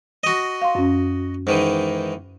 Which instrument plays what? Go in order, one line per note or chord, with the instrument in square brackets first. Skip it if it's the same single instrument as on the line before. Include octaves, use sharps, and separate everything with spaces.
[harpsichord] F#4 D#5
[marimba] F5 C6
F#2 C#4
[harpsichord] G#2 D#3 E3